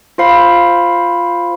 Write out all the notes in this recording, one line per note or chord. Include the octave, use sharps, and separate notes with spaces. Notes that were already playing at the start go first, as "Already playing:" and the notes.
F4 C5 F5 B5